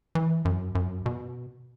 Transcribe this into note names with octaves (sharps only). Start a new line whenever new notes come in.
E3
F#2
F#2
B2